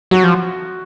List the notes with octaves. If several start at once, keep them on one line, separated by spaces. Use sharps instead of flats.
F#3 F#4
F3